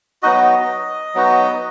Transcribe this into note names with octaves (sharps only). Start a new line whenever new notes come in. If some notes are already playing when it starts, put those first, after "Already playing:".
F#3 B3 D#4 F#4 D#5
F#3 B3 D#4 F#4